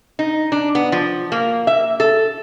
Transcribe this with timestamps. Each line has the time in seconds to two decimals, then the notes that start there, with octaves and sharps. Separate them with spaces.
0.19 D#4
0.52 D4
0.75 B3
0.92 F3
1.32 A#3
1.67 E5
2.00 A4